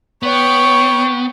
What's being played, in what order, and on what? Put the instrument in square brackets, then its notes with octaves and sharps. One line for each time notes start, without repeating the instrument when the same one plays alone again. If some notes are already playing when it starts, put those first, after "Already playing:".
[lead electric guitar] B3 [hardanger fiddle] C#5 G5